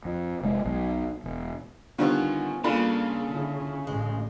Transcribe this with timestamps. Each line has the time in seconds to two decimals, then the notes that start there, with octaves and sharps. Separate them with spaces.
0.05 F2
0.41 F1 G#3
0.65 B1 B2 F#3
1.24 E1
1.98 D3 D#3 G3 B3 C#4 F4
2.64 C#3 G3 A#3 D4 F4 A4 B5
3.30 D3 E4
3.87 A1 A2 G#3